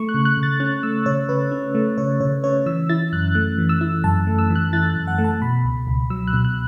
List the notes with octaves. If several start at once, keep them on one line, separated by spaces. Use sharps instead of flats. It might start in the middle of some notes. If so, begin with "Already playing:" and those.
Already playing: A3 C#6
F#6
C#3
F#6
C#3
A6
C#4 F#6
A3 E6
C#3 C#5
C#3 B4
C#4
A3
C#3 C#5
C#3 C#5
C#4 C#5
E3 E6
E4 A6
F#2 F#6
A3 F#6
E3
E6
E4
F#2 A5
A3
E6
E3
F#6
E4 A6
F#6
F#2
F#5
A3
A5
B2 B5
C#2
C#2
F#3 E6
F#6
B2
F#6